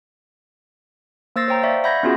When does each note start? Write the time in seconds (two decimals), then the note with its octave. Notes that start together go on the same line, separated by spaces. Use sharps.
1.36 A#3 C5 E6 A6 A#6 C7
1.48 C5 C#5 G5 A#5
1.63 D5 E5 F5 C#6
1.84 E5 F#5 B5 G6 G#6 A#6
2.03 B3 C#4 F4 F#4 G#4